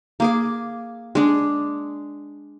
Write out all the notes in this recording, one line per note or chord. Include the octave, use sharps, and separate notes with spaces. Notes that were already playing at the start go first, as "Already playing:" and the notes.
A#3 G#4 D6
G#3 D4